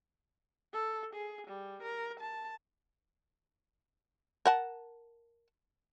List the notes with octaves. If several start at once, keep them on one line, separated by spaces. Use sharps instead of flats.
A4
G#4
G3
A#4
A5
A#4 F#5 A5